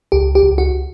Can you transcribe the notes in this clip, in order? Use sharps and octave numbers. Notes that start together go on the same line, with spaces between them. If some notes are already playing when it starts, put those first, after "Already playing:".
C#2 G4
G4
C#2
F#4